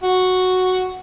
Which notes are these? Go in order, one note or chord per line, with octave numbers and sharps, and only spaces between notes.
F#4